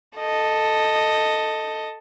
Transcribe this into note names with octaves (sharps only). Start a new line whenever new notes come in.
A4 D#5